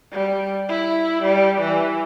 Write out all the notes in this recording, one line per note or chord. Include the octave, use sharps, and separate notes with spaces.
G3
E4
G3
E3